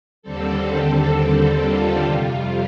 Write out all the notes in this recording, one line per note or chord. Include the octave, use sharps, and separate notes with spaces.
D#2 D3 G3 C4 A4
F4
F2 C3 G3